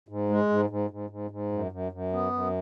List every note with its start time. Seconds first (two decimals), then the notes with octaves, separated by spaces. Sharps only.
0.08 G#2
0.30 G#3
0.49 G#2
0.70 G#2
0.90 G#2
1.10 G#2
1.31 G#2
1.52 F#2
1.72 F#2
1.92 F#2
2.12 B3
2.33 F#2